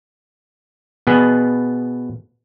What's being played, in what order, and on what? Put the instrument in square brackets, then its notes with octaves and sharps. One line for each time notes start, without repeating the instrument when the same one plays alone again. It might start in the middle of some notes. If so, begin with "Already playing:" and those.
[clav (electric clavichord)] B2 B3 G#4